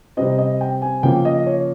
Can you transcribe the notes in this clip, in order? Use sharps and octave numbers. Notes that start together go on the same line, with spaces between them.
C3 G3 C4 D#5
D#5
G5
G#5
C#3 F3 A#3 G5
D#5
C#5